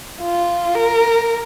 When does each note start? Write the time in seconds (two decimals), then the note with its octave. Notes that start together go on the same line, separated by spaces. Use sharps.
0.22 F4
0.75 A#4